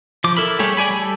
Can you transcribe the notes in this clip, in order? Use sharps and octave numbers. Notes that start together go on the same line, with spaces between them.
F3 D6
E4 A4 A#4 B5
G3 A3 G4 G#4 C#5
G#4 D5 G#5 B5
G3 A4